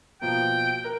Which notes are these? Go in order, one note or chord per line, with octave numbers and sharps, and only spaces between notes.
B2 F3 A#3 G5
A#4 F#6